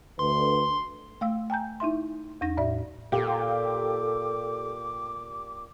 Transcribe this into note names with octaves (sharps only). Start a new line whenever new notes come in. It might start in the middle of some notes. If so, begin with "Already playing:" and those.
D2 D3 B4 C6
A3 F5 E6
G5 G#5 A#5 G6
D#4 E4 E5 C6
E2 D#4 A#6
A2 D5 E5
A#2 G4 A4 F5 G5 D6